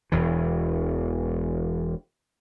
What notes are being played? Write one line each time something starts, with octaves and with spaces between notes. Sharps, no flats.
E1 E2 E3